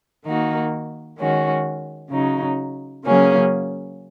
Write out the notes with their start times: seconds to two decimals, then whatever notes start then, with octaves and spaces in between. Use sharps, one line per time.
0.24 D#3 A#3 D#4 F#4
1.18 D#3 G#3 C#4 F#4
2.10 C#3 F#3 D#4
3.03 C#3 F#3 A#3 C#4 G#4